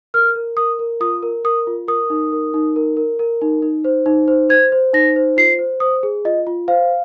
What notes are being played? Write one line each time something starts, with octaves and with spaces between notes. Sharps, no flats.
A#4 F6
A#4
A#4 D#6
A#4
F4 D#6
A#4
A#4 D#6
F4
A#4 D#6
D#4
A#4
D#4
A#4
A#4
A#4
D#4
D#4
C5
D#4
C5
C5 G#6
C5
D#4 A#6
C5
F4 C7
C5
C5 D#6
G#4
F4 D#5
F4
C5 F5